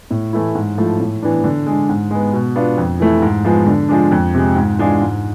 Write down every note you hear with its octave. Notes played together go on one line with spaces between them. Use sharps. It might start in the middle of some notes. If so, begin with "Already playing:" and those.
A2
E3 A3 E4
G#2
F3 A3 E4
A2
E3 B3 D4
D3
G#3 D4
G#2
G#3 B3
B2
B3 D4 F4
F2
E3 A3 E4
G#2
F3 G#3 B3
D3
F3 G#3 D4
F2
C3 G#3
G#2
E3 G#3 D4 F4
G#2